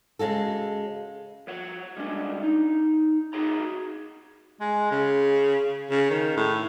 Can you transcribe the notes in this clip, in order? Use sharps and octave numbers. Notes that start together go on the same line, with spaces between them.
C#3 G#3 F#4 A4
F3 C#5 F#5
G3 G#3 C#4 D4
D#4
D#4 F#4 G#4 C#5 A#5
G#3
C#3
C#3
D#3
A2